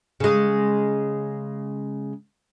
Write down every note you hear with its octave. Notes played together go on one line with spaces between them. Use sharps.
C#3 G#3